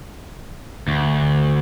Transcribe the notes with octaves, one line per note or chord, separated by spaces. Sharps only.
D2